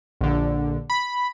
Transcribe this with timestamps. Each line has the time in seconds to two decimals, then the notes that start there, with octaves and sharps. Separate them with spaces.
0.21 A#1 D3
0.90 B5